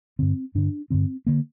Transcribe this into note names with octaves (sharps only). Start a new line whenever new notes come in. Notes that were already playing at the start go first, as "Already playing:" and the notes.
G2 D3 C4
G2 D3 D4
G2 D3 C4
D3 A#3